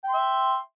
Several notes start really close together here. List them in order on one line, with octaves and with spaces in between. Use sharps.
G5 C6 E5